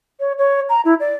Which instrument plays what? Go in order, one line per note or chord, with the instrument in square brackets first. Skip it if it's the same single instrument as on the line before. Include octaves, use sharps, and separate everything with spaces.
[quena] C#5
C#5
A#5
E4
D5